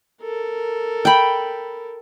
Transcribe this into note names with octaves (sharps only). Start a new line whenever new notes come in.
A4 A#4
G5 B5